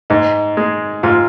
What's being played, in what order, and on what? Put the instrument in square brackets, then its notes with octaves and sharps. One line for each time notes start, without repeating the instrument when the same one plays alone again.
[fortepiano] G#2 [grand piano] D#4
[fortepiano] G#3
[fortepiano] G#2 [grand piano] F4